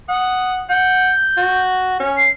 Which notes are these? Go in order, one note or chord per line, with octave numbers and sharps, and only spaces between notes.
F#5 D#6
F#5 G6
F#4
C#4
C7